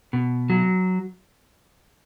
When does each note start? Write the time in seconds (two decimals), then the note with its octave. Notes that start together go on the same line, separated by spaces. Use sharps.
0.13 B2
0.50 F#3